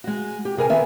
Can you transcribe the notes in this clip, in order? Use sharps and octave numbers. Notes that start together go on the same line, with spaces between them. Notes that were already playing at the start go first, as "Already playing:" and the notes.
G#3 F#4
G4
C3 G#4 A#4 G#5
D#3 B3 E5 G#5